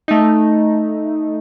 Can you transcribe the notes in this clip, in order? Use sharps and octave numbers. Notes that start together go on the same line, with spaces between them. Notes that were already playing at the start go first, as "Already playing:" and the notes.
A3 D#4